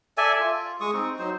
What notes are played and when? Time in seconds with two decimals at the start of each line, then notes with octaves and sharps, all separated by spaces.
0.18 A4 D5 E5 G#5
0.40 F4
0.80 G#3 C#6 D#6
0.93 C4 D#4
1.19 F#3 D#4 C5